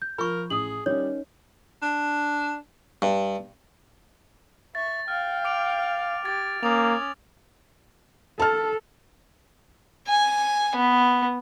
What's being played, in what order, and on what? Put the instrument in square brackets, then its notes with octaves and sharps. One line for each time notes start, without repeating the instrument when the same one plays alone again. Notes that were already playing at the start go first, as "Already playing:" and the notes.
[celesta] G6
[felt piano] F3 [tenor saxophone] A#4 [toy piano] B5 C#6
[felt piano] A1 [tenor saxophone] G#4 [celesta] D#6 F#7
[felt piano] D#3 C#4 [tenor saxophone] G3 [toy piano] C#5
[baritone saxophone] D4
[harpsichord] G2
[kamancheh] E5 C#6 [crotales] A6
[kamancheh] F5 G5 [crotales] F6
[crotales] D6 D7 F7
[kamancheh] G4 [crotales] G#6 A6
[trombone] A#3 [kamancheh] C#4 [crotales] D6 D#6 F7
[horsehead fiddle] A4 [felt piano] A5 F6
[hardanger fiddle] G#5
B3